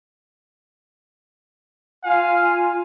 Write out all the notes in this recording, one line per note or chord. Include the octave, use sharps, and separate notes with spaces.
F4 F5 G#5